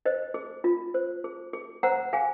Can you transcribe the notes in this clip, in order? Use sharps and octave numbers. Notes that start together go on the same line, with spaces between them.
C5 D#5
G#4
F4
C5
G#4
G#4
C5 F#5 A#5
G#4 F5 G#5